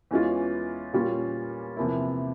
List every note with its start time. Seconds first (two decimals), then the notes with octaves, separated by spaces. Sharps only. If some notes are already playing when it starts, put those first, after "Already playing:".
0.11 E2 E3 G#3 C#4 F4
0.93 A#2 G3 C#4 F4
1.77 E2 C3 F3 A#3 E4